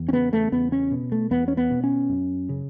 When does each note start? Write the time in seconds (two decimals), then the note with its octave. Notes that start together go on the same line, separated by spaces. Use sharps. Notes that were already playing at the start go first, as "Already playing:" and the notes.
Already playing: E2
0.09 C#4
0.13 C#3 B3
0.33 A3
0.52 E2 B3
0.72 C#4
0.92 B2
1.12 A3
1.31 E2 B3
1.48 C#4
1.57 B3
1.71 B2
1.84 C#4
2.09 F#2
2.49 C#3